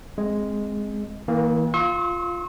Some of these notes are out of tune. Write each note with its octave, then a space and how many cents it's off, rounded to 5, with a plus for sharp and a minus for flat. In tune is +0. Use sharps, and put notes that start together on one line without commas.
G#3 +0 C4 +5
E3 -45 A#3 +0
F4 +0 C#6 -45 E6 -40